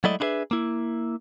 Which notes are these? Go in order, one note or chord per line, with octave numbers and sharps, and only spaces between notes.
F#3 G#3 A3 E4 D5 D#5
D4 E4 G#4 B4 E5
A#3 E4